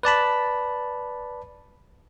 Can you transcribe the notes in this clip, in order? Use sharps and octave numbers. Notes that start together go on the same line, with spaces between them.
B4 D5 A5 B5